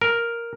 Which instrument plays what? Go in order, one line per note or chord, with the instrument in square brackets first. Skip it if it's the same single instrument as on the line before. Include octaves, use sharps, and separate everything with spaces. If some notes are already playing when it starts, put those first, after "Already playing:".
[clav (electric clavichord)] A#4